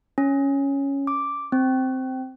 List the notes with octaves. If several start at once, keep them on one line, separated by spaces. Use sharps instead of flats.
C#4
D6
C4